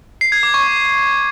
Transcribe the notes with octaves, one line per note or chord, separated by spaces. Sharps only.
C7
G#6
D6
C#6